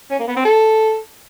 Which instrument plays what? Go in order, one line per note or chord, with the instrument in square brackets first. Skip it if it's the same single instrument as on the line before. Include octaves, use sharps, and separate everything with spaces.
[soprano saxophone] C#4
A#3
B3
C4
A4